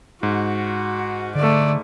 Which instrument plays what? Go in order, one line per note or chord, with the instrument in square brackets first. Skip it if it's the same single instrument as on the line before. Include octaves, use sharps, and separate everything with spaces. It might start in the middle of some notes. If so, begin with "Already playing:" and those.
[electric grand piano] G#2 [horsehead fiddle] F#4
[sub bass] D3 [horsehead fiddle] A3 D5